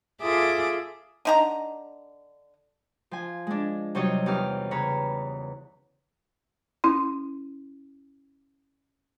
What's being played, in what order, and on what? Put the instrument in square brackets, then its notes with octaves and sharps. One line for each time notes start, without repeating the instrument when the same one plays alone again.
[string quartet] F4 G#4 A4 E5 D6 D#6
[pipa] D3 D#4 A#5
[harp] F3 G#5
G#3 D4
C3 F#3 G3 D#4 C#5 D#5
E2 D#4 G4 F6
C#3 B4 C#5 A#5
[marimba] C#4 E4 C6